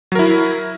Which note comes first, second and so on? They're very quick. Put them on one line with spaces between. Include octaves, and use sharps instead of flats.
F#3 A#4 E4